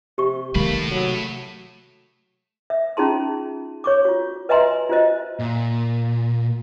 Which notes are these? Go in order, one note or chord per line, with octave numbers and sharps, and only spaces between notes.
C3 G4 C#6
C3 D#3 A3 A#3 B5
F#3
E5
C#4 D#4 F4 G#4 A5 C6
C#5 C#6 D6
F4 F#4
B4 D#5 E5 G#5 A#5 C6
F4 F#4 C5 D#5
A#2